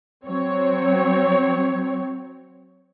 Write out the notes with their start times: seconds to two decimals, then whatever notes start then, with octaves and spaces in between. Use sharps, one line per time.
0.26 F#3 C4 C#5